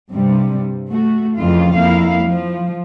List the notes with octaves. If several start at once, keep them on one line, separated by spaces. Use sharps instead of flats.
G2 C3 G3
A3 F#4
F2 C#3 E3 F4
F2 A#3 E4 F5
F3